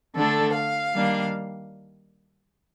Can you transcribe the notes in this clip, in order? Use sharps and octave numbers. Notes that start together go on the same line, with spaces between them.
D3 A3 D4 A4
F5
D#3 G3 A#3 D4